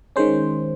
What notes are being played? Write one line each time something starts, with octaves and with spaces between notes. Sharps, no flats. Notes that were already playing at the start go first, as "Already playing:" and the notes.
D#3 G#3 C#4 C5